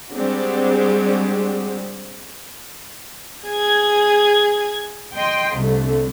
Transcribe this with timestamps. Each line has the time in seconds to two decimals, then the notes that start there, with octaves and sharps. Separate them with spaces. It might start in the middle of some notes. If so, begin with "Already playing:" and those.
0.12 G3 G#3 C4 D4 F#4 G4
3.47 G#4 G#6
5.16 D#5 G5 C6
5.58 C2 D3 A3